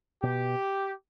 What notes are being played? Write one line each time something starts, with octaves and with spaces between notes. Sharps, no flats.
B2 G4